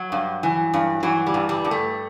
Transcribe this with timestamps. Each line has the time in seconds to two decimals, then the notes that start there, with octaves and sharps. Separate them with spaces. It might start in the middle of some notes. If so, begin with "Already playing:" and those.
Already playing: F#3
0.12 G2
0.43 E3
0.74 G2
1.03 E3 F#3
1.27 G3
1.34 G2
1.49 G3
1.64 G2
1.71 A3